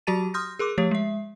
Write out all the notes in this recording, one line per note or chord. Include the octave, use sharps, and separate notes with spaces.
F#3 F#4 G4 A5 A6 D#7
C6 D#6 F6 G6 A#6
G#4 A#4 C6 D6
F3 A3 G4 C#5
G#3 E5